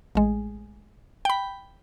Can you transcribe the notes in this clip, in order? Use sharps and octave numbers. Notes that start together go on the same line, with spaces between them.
A1 G#3
G5 B5